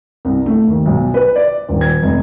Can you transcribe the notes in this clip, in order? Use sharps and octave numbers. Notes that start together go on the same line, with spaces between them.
C2
A3
D#2
B1
B4
D5
D#1
G#6
F1